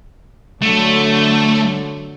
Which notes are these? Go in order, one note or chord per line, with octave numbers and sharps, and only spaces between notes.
D3 F#3 A3